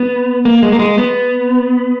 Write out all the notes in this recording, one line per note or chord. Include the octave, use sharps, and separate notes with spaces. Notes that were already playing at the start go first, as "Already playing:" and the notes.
Already playing: B3
A#3
G#3
A#3
G#3
B3